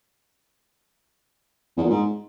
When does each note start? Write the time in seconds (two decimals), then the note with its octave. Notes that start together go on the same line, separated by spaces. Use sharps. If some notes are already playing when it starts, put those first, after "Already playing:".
1.77 E2
1.83 A#2
1.89 G#2